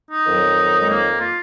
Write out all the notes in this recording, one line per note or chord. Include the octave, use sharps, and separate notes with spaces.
D#4
F2 D#3 F#3
G#3
A#3
F4